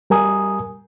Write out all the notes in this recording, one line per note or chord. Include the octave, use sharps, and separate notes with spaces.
G3 A#4 G#5 D#6